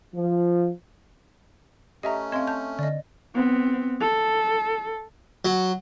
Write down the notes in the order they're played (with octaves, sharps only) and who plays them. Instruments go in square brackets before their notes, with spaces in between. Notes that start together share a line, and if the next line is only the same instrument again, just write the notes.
[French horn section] F3
[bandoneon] A3 C#4 [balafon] G4 [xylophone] D#5 E5 A#5
[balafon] C4 F5 [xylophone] D#5 C6
[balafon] A5 [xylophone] G6
[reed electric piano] D3 [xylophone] D5 D#5
[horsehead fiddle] B3 C4
A4
[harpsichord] F#3